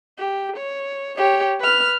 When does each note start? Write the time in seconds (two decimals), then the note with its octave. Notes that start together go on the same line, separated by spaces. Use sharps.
0.18 G4
0.57 C#5
1.17 G4 C#5
1.60 B4 F6